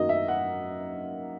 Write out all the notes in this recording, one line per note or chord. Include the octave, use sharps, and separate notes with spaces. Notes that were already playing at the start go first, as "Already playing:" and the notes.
Already playing: F#2 D#3 F#3 A#3 D#5
E5
F#5